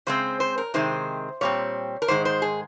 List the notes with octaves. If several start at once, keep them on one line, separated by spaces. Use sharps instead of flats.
C#3 G#3 C4 C5
C5
A#4
C3 D#3 G#3 C4 C5
A#2 G3 C4 C#5
A#4
G#2 D#3 G#3 C5
C5
G#4